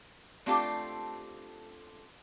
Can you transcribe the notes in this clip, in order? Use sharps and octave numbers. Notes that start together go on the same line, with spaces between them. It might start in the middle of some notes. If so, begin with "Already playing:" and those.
A3 C4 D4 F4 G4 A4